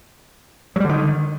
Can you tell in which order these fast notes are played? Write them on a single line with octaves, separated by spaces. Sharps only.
F#3 G3 D3 D#3